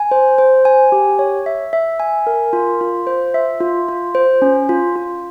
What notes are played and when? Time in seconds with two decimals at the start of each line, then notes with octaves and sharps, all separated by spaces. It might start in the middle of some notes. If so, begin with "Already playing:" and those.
Already playing: G#5
0.11 C5
0.38 C5
0.65 G#5
0.92 G4
1.19 C#5
1.46 E5
1.73 E5
2.00 G#5
2.27 A#4
2.53 F4
2.81 F4
3.07 C5
3.34 E5
3.60 F4
3.88 F4
4.15 C5
4.42 C#4
4.69 F4
4.96 F4